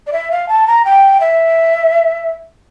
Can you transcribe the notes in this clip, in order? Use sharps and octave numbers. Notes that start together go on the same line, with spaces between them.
D5
E5
F5
A5
A#5
G5
E5